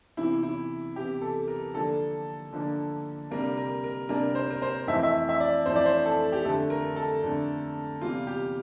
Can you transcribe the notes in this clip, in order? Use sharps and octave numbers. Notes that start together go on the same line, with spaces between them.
E2 C3 E3 E4
E4
E2 C3 E3 G4
A4
A#4
D3 F3 A#3 D4 A4
D3 F3 A#3 D4
C3 G3 A#3 D4 A#4
A#4
A#4
C3 G3 A#3 D4 A#4
C5
A#4
C5
F2 E3 A3 E5
E5
E5
D5
F2 E3 A3 C5
D5
C5
A4
G4
F2 D3 A3 D4 A4
A#4
A4
F2 D3 A3 D4
E2 C3 G3 A#3 F4
G4